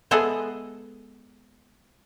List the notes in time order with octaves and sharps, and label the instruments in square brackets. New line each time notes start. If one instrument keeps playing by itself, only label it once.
[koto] G#3 B3 G#4 A4 D#5 E5